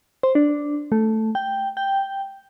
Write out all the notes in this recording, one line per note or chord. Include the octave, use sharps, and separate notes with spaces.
C5
D4
A3
G5
G5